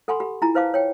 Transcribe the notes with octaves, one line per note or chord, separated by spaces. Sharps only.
A4 F#5 G#5 B5 C6
G4 B5
E4 F4 G#5 A#5
E4 B4 C5 F5 A5 D6
C#5 G5